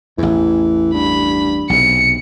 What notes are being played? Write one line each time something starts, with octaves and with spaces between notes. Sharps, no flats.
A1 E2 E3
G2 B5
B1 C3 C#7